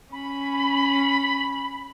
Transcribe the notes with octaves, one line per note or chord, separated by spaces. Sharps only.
C#4 B5